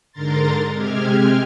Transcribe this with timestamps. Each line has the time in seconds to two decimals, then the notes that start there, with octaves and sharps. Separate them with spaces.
0.12 G#2 D3 A#4 A#5 C6 A6
0.72 C3 G#3 C4 G4 F6 G#6